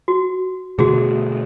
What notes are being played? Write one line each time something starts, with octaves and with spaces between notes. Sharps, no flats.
F#4
B2 D3 A3 F#4 G#4